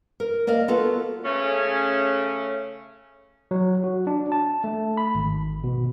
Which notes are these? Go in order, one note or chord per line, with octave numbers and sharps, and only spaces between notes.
A#4
A#3 D5 D#5 F5
B3 F4 F#4 A4 A#4
C#3 A3 C#4
F#3
F#4
D4
A5
A3
B5
G#1
B2